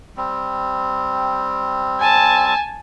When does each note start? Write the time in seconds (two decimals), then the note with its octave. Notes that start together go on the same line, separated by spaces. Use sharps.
0.17 G3 C4
2.00 G#5 A5